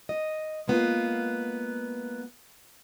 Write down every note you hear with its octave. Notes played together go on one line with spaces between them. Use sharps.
D#5
G#3 A#3 B3 F4